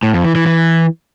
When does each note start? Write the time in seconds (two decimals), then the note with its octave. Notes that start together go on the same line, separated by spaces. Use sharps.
0.03 A2
0.14 F2
0.24 E3
0.35 E3
0.46 E3